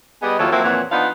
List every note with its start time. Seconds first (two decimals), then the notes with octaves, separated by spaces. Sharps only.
0.23 G3 B3 G#4 D#5
0.39 D#2 F3 F#3 E4 F4 A4
0.52 F3 F#3 A#3 C4 E4
0.64 F2 A#2 E3 C#5 F#5
0.92 F3 B3 D4 D#4 F5 F#5